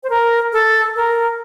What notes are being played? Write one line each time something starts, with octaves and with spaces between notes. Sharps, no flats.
C5
A#4
A4
A#4